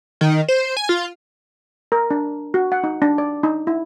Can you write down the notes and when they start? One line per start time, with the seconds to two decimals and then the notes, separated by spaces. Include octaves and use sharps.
0.21 D#3
0.49 C5
0.77 G#5
0.89 F4
1.92 A#4
2.11 D4
2.54 F#4
2.72 F#5
2.84 D#4
3.02 D4
3.18 D5
3.43 D#4
3.67 E4